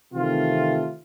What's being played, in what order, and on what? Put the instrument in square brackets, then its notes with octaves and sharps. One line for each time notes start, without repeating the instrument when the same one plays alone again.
[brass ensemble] C3 D#3 E3 A3 C4 F4